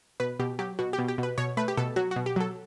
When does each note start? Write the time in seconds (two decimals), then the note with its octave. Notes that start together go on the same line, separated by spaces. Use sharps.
0.20 B2 B4
0.39 B2 G4
0.59 F#3 G4
0.79 B2 F#4
0.93 G4
0.99 B2
1.08 G4
1.18 B2 B4
1.38 B2 C#5
1.57 A3 B4
1.68 G4
1.77 B2 A4
1.96 F#3 F#4
2.11 F#4
2.16 B2
2.26 G4
2.36 F#3 A4